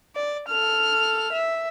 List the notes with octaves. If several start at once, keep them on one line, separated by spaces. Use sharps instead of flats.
D5
A4 F6
E5